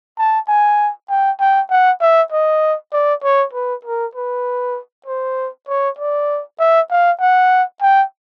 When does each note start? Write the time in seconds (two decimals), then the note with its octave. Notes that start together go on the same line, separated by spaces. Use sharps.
0.18 A5
0.48 G#5
1.10 G5
1.40 G5
1.70 F#5
2.01 E5
2.32 D#5
2.93 D5
3.24 C#5
3.53 B4
3.85 A#4
4.15 B4
5.06 C5
5.68 C#5
5.99 D5
6.59 E5
6.90 F5
7.20 F#5
7.82 G5